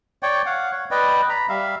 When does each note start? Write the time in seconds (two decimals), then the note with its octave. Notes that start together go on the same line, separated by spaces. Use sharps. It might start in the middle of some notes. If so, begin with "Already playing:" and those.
0.23 C#5 D5 G5
0.46 F5 F#5
0.72 C#5
0.91 B4 D5 D#5 G5
1.29 A#5 B5
1.49 G3 E5 F5